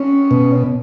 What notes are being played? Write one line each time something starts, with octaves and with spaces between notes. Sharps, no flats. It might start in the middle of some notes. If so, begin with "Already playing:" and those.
Already playing: C#4
B2